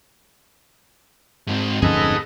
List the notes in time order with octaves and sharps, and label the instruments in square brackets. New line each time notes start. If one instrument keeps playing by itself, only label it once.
[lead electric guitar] G#2 C4
[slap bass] D1 F2 C#4 [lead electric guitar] D#4 G#4 [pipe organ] A4 B4 D#5